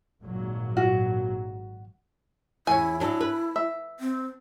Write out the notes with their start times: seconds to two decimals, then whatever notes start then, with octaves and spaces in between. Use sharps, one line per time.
0.21 G#1 A#2 F#3
0.77 F#4
2.67 E2 C#4 E4 G#5
3.00 F#3 D4 E4
3.21 B4
3.56 E5
4.00 C4